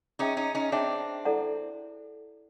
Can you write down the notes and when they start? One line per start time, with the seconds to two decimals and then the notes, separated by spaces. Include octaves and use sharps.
0.19 C#4 D#4 G#4 C#5 E5 G5
0.37 C#4 D#4
0.55 C#4 D#4
0.72 C4 D4 G#4 C#5 E5 G5
1.25 E4 A4 D5 F#5 A#5